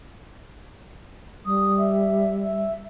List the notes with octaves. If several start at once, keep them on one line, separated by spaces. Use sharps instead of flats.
G3 D#6
E5
E5